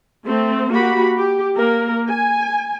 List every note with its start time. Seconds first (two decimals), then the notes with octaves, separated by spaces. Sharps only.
0.25 A3 C4
0.71 A#3 F#4 G4 B5
1.16 G4
1.56 A#3 A#4
2.09 G#5